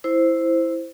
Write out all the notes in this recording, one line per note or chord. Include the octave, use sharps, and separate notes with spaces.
E4 C5